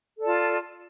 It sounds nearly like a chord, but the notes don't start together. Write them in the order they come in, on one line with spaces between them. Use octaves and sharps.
A4 D5 A5 F4